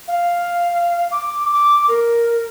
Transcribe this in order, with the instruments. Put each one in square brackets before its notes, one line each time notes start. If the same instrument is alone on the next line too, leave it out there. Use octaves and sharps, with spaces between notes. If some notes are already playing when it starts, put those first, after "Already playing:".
[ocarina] F5
D6
D6
A#4